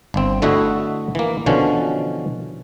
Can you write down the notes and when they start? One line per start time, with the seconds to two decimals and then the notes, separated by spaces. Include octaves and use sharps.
0.14 G1 C4
0.42 D3 A3 E4 F#4 D#5 E5
1.15 E3 A#3
1.46 B2 D3 E3 F3 C#4